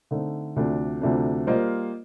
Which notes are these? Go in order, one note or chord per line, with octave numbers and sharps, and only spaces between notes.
D3 A3 C4 D#4
D2 C3 F3 A3 D4
D2 C3 F3 A3 D4
G3 A#3 F4 C5 D#5